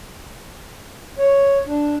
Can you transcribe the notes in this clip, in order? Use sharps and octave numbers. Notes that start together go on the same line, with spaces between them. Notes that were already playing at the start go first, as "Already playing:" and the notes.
C#5
D4